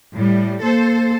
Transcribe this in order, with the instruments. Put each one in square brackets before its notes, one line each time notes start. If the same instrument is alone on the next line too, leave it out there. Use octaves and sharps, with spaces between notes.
[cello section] A2 G3
[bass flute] A#3 [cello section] A4 C5